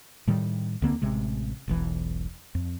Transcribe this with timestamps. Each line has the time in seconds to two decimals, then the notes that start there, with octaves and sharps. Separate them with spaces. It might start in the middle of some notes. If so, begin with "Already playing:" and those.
0.27 A2 D#3 G3
0.82 C#2 D3 A#3 C4
1.02 A1 C3 G#3
1.68 E1 B1 E3
2.55 F2